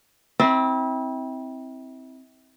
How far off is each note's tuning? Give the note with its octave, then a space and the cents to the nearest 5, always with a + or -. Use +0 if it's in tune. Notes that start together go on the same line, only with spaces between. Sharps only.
C4 +0 E4 -35